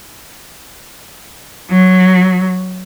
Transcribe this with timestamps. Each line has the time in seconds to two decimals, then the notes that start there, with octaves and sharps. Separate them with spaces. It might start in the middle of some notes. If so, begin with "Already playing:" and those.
1.70 F#3